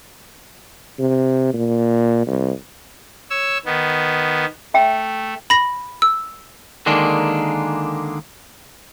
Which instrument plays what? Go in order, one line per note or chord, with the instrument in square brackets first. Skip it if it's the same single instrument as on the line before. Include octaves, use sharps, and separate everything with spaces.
[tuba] C3
A#2
C2
[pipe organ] C#5 E6
D#3 B3
[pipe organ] A3 [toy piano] E5 G5
[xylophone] B5 A#6
E6
[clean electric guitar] D3 D#3 G#3 A#3 D4